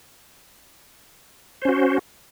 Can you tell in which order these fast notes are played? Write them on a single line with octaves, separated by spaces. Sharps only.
C5 C#4 F#4